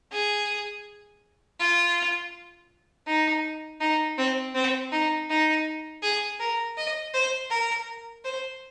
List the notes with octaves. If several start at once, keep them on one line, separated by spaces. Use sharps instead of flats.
G#4
F4
D#4
D#4
C4
C4
D#4
D#4
G#4
A#4
D#5
C5
A#4
C5